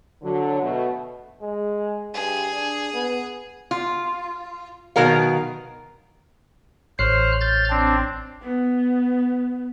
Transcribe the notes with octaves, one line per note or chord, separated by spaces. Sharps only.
D3 F#3
B2 A3
G#3
G2 G#4
D4
B3
F4
B2 D#3 F#3 A#4 F5
A1 C5 C#5 F6 F#6 C7
F6 G6 A6
C4 D4
B3